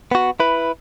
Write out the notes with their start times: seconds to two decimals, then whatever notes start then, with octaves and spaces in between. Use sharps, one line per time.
0.11 B3 F#4
0.40 E4 B4